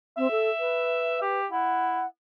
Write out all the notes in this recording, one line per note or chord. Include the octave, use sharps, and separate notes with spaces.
C4 E5
A4
B4
G4
E4 F#5